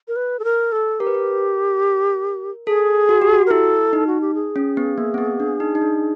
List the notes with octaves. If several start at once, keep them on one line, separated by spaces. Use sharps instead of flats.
A#4
B4
A4
A#4
A4
G4 A#4
B4
A#4
G#4 A4
F#4
G4
F#4
A#4
E4 A4
D#4
F#4
G4
G#4
C#4
B3
A#3
C4
B3
D4
D#4
D#4
D4